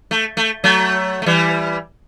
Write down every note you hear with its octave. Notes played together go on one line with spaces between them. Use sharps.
A3
A3
F#3 A3
A3
E3 G3